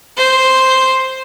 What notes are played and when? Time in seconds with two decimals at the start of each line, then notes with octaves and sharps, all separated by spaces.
0.17 C5